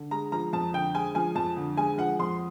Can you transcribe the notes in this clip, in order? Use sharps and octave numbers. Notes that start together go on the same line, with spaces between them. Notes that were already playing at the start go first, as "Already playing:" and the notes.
Already playing: D3
G#3 A#5
F3 A#5
F2 A5
D3 G5
G#3 G#5
F3 G#5
F2 A5
D3
G#3 G#5
F3 F#5
F2 C6